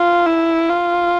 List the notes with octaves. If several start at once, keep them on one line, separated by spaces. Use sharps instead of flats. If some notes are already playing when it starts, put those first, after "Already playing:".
Already playing: F4
E4
F4